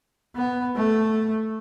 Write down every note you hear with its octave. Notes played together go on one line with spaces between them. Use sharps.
B3
A3